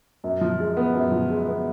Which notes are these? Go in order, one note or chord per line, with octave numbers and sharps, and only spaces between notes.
F#2
F3
G#3
B3
F#2
F3
G#3
B3